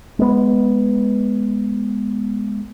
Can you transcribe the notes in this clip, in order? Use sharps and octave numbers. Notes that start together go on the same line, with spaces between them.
G#3 B3